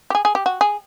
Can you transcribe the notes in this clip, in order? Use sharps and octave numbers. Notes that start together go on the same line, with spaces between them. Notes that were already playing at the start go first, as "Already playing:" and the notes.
G4
G#4
G#4
G4
F#4
G#4